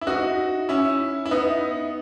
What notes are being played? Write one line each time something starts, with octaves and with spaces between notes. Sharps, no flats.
E4
D#4 F#4
C#4 E4
E4
B3 D#4